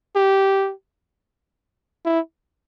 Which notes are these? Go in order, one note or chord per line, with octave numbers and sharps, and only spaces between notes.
G4
E4